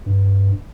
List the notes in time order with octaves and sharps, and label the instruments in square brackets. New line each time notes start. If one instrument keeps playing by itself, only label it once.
[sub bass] G2